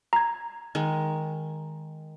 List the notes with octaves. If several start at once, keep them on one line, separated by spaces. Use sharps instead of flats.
A#5 G#6
D#3 G#3